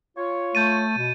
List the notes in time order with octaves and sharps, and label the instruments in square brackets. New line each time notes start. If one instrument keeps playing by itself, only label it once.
[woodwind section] F4 C#5
[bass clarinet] A3 [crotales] G6 A6 D#7
[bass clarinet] B2